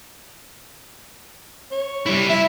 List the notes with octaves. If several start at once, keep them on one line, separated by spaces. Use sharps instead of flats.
C#5
G3 E4
E4 E5